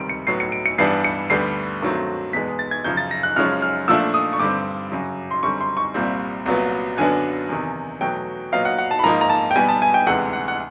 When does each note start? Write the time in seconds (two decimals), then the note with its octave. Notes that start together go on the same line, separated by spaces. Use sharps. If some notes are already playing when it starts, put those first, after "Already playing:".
Already playing: C#2 C3 D#3 G3 C4 D7
0.09 C#7
0.27 A2 F#3 B3 C7
0.40 C#7
0.52 D7
0.66 C#7
0.78 G2 E3 G3 B3 D4 C7
1.04 C#7
1.30 D2 D3 G3 B3 C7
1.82 G2 D#3 F#3 A3 C4
2.33 E2 B2 G#3 B3 B6
2.59 A6
2.71 G#6
2.84 F#2 C#3 F3 G6
2.97 A6
3.11 A#6
3.23 F#6
3.36 F#2 C#3 F3 G#3 C#4 F6
3.62 F6
3.88 A#2 F3 A3 D4 E6
4.14 D#6
4.33 C#6
4.40 G2 D3 G3 C4 D6
4.92 F#2 C#3 F#3
5.31 C6
5.42 F#2 D3 G3 C4 C#6
5.61 C6
5.77 C#6
5.94 C2 A#2 G3 C4
6.46 C2 A#2 F#3 B3
6.97 F#2 D3 F#3 B3 D4 G#5
7.49 E2 C3 D#3
8.01 E2 B2 F#3 A3 G5
8.52 A#2 F#3 B3 D#4 F5
8.65 F#5
8.78 F#5
8.91 A5
8.99 B5
9.03 G#2 F3 A#3 D#4 A#5
9.21 A#5
9.30 A5
9.51 G5
9.55 B2 G3 B3 G#5
9.69 A5
9.82 G#5
9.94 G5
10.07 D2 C3 E3 G#3 F#5
10.33 F#5
10.48 F#5